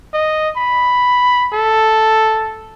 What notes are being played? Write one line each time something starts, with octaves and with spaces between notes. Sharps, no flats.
D#5
B5
A4